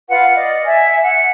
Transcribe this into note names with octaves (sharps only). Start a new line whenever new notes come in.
F4 B4 F5 F#5
D5 D#5
E5 G#5
F#5